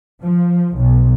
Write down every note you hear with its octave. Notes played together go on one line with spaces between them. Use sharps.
F3
B1